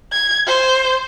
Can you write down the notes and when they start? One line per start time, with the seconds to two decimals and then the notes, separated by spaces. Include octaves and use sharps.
0.13 G#6
0.47 C5